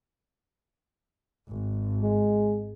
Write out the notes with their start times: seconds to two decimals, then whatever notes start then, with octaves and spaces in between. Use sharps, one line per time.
1.49 G#1
2.03 G#3